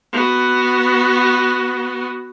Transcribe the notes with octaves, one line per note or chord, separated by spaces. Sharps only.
B3 F#4